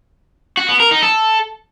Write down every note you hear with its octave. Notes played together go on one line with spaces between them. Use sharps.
F#4
B3
A#4
D#4
A4